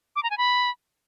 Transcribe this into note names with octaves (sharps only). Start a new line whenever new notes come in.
D6
A#5
G#5
B5